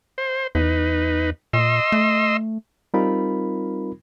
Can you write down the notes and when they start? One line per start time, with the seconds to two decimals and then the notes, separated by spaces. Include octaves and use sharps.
0.18 C5
0.55 E2 D#4 B4
1.53 A#2 D#5 C6 E6
1.92 A3
2.94 G3 C4 D#4 F4 A#4 B5